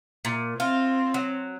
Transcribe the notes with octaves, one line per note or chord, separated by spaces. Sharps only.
A#2
C4 F4
F#3